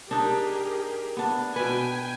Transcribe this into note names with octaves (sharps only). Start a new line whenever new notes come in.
D4 D#4 G4 G#4 A#4
B3 D4
B2 B4 G5 G#5